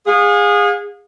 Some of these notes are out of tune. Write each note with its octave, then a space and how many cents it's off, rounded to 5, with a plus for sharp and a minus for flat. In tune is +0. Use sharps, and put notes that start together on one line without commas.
G#4 -20 F5 +40